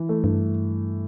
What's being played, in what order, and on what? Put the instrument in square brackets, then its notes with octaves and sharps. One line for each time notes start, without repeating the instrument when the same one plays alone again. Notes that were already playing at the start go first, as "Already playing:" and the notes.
Already playing: [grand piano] E3
A3
[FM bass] G2